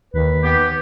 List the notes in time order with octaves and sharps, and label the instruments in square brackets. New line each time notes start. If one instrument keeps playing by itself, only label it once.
[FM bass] D#2 [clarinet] B4
[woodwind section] B3 G4